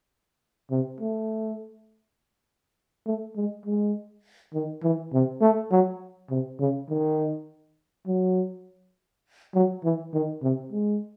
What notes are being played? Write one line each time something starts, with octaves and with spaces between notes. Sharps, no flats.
C3
A3
A3
G#3
G#3
D#3
E3
C3
A3
F#3
C3
C#3
D#3
F#3
F#3
E3
D#3
C3
G#3